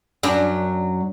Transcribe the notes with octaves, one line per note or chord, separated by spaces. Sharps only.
F#2 F#3 D4